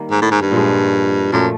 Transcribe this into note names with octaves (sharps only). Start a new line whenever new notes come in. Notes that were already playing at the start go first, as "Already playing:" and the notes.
Already playing: D#3 G3 A#3
G#2
A2
G#2
G2
A#2 F3 G#3
F#2 A#2 F3 A3